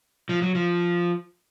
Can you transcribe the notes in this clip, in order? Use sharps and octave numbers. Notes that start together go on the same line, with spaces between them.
F3
F#3
F3